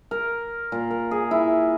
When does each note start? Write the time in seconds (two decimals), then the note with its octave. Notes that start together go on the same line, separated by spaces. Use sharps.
0.11 A#4
0.72 A#2
0.91 A#4
1.11 G#4
1.31 E4